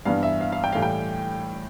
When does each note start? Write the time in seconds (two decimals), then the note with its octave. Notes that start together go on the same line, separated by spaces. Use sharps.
0.05 G2 E3 B3 D4 F5
0.23 E5
0.41 F5
0.52 F5
0.64 G5
0.72 A2 E3 G3 F5
0.82 G5